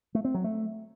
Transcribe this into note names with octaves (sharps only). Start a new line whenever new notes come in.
A3
C4
F#3
A3